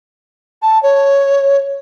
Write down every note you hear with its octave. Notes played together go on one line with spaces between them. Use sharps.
A5
C#5